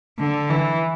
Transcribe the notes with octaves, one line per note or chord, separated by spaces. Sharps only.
D3
E3